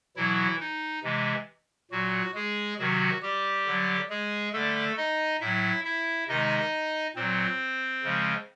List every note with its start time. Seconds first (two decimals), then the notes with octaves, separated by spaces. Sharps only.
0.16 B2 E3 F#3 E4
0.60 D#4
1.03 C3 E3 G#3
1.91 A#2 F#3 F#4
2.34 G#3 G#4
2.78 C3 D#3 F#3 F#4
3.22 G3 G4
3.66 D3 F#3
4.09 G#3 G#4
4.53 D3 G3 A3 A4
4.97 D#4 D#5
5.41 A2 F#3 E4 E5
5.85 E4 E5
6.28 C3 D#3 G#3 D#4 D#5
7.15 A#2 F#3 C4 C5
8.03 C#3 F3 G#3